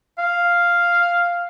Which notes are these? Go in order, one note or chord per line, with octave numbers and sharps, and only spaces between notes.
F5